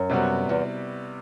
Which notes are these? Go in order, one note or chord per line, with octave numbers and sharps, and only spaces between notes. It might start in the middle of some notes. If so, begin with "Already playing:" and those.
Already playing: F#2
C3 G3 B3 F#4
E2